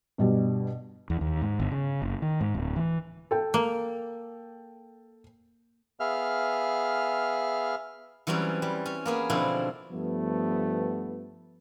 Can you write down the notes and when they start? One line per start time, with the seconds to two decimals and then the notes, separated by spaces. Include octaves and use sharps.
0.18 G2 B2 G3
1.10 E2
1.21 D#2
1.42 G#2
1.60 G1
1.71 C#3
2.02 F#1
2.22 D#3
2.41 G#2
2.55 D1
2.76 E3
3.31 A4 G5
3.54 A#3
6.00 B3 G#4 E5 F5 F6
8.27 E3 F#3 G3 C4 C#4
8.62 G3
8.86 C#4
9.06 A#3 B3 G#4
9.30 B2 D3 F3 C4 E4
9.91 G2 F3 A3 B3